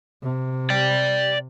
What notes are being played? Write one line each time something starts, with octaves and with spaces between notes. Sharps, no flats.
C3
D5 G5